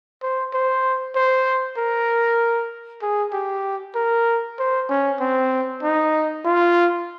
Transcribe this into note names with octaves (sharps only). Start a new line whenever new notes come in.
C5
C5
C5
A#4
G#4
G4
A#4
C5
C#4
C4
D#4
F4